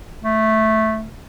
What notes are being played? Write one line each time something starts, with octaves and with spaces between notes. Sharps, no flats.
A3